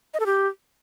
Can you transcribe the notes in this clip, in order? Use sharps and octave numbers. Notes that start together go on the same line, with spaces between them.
D#5
A4
G4